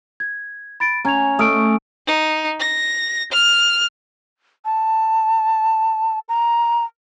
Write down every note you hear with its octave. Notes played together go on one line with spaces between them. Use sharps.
G#6
B5 A6 D7
C#4 A#5 G#6 F7
A3 D#6 F6 D7
D#4
A#6
F6
A5
A#5